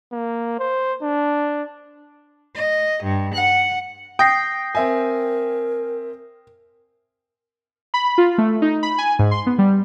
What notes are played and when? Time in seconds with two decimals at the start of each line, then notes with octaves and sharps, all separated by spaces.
0.12 A#3
0.59 C5
1.02 D4
2.56 D#5
3.03 G2
3.35 F#5
4.19 G5 D#6 A#6 C7
4.75 C4 A#4 E5 G#5
7.94 B5
8.18 F4
8.38 A3
8.62 D#4
8.83 B5
8.98 G#5
9.19 G#2
9.31 C6
9.46 B3
9.59 G3